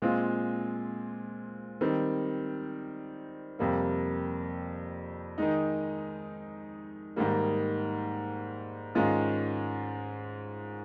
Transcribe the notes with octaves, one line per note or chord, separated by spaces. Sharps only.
A#2 G#3 C4 F4
D#3 G3 C4
F2 C3 G3 A#3
D#3 G#3 D#4
G#2 D#3 G3 A#3
G#2 D#3 G#3 C#4 F4